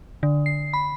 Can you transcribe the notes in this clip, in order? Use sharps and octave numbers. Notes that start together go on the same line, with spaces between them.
D3
C7
B5